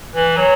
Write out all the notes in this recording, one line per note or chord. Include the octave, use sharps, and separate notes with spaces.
E3
F#3